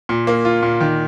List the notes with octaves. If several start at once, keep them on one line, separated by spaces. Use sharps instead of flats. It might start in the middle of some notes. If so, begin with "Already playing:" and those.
A#2
A#3
F4
A#2
D#3